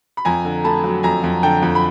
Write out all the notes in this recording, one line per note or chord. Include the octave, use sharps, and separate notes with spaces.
B5
F2 G#5 A#5
D3
A3 A5 B5
F#3
F2 G#5 A#5
F2
D3 G5 A5
F2
B5